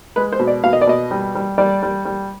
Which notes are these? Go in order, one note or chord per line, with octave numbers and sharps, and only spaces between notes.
G#3 B4
C5
B2
D5
B2 F5
D#5
D5
B2 D#5
G3
G3
G3 D5
G3
G3